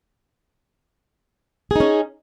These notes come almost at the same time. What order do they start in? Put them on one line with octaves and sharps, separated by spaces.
G#4 D#4 C#4